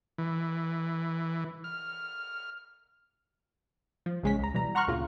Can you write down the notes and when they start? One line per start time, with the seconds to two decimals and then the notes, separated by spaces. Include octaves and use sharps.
0.18 E3
1.64 F6
4.06 F3
4.23 A#1 C#3 G#3 C#4 B6
4.39 C#2 A#5
4.54 B2 E3 G3 A#5
4.75 F#5 A#5 C6 C#6 F6 F#6
4.87 D2 A#2 C#3 F4